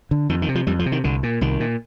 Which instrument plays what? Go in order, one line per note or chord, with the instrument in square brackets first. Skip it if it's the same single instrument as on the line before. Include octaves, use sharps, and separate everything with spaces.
[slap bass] D3
F2 D#3
D#3
C3
F3
F2 G3
F3
C3
D#3
C2 D3
A#2
C2 D#3
A#2